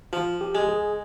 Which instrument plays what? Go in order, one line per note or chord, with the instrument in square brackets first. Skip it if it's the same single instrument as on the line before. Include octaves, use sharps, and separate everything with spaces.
[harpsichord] F3 [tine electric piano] F4
[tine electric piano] G4
[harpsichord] G#3
[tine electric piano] G#4